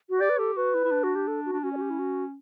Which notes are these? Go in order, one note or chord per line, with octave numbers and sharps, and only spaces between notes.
F#4
G4 D5
B4
G4 A4
F#4 B4
E4
E4
D4
F#4
G4
A4
F#4
D4
C#4 F#4
D5
F#4
G4
E4
F#4